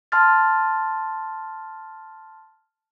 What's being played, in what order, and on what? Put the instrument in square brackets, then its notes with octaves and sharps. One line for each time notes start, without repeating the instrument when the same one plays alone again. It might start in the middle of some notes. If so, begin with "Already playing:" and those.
[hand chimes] A5 C6 F6 A6